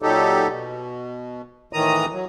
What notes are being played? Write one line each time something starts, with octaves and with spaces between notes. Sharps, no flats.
A#2 F#3 D#4 G4 A4
B2
A2 D#3 E3 A#5 D#6
F#3